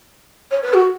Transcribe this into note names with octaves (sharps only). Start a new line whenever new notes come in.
C#5
B4
F#4